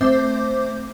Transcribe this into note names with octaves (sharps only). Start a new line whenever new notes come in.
A3 C4 C5 E5 D6 G6